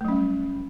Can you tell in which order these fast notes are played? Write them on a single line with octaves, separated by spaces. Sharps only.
A3 F#3 C#4 G3